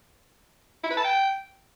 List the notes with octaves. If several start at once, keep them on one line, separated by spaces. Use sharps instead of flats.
E4
B4
A5
G5